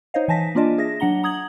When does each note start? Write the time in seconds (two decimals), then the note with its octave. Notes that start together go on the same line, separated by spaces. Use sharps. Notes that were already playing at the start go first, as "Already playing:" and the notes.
0.14 D#4 C5 C#5 D#5 F5
0.28 E3 G#5 A5 A#6 B6
0.55 A#3 D4 F4 D5 D#5 A5
0.78 G#4 E5 A#6
1.00 F#3 D4 F#5 A#5 G7
1.23 A#5 D#6 G#6 F#7